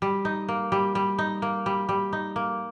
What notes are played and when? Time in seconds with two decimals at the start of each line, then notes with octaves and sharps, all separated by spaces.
0.02 G3
0.25 D#4
0.48 A#3
0.72 G3
0.95 G3
1.18 D#4
1.42 A#3
1.66 G3
1.89 G3
2.13 D#4
2.36 A#3